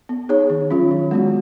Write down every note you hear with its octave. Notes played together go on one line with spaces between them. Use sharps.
B3
D#4 G#4 C#5
D#3
F#3 C#4 F4
D#3
G#3 B3 F#4